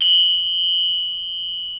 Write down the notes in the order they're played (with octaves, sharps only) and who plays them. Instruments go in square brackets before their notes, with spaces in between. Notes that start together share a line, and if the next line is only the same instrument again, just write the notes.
[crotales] F#7 G7